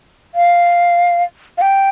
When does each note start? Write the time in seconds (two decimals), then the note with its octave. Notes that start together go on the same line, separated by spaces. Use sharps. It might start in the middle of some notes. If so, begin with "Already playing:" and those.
0.35 F5
1.58 F5
1.61 G5